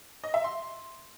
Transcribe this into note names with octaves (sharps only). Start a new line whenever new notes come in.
D#5
E5
C6